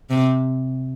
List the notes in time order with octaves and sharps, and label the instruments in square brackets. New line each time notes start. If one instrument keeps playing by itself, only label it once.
[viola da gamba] C3